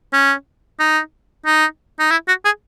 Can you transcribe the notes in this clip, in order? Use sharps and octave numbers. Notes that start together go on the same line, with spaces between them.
C#4
D#4
D#4
D#4
E4
F#4
G#4